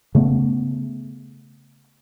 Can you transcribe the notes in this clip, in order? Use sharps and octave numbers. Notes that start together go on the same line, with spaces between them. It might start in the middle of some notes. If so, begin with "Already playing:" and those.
C#3 A3 B3